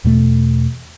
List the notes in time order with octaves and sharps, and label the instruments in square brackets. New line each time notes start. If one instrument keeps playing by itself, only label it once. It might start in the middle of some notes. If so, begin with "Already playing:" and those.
[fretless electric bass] E2 B2 A3